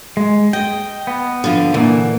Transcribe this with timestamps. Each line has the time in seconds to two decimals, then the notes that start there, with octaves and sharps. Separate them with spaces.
0.17 G#3
0.53 D#5 G5
1.07 B3
1.44 D3 F3
1.74 A#2 D3 E3 A#3